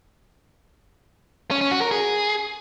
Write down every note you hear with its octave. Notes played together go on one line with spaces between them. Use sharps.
C#4
C#4
F#4
A#4
G#4